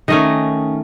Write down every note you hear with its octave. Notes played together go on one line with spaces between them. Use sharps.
D#3 A3 C#4 D#5